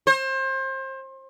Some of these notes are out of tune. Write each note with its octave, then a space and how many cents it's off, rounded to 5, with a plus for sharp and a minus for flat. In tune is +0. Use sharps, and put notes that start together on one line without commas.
C5 +30